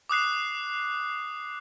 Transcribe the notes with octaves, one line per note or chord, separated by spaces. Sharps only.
D6 D#6 F#6 C7